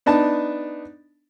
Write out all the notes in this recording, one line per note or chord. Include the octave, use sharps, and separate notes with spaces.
B3 D4 D#4 A5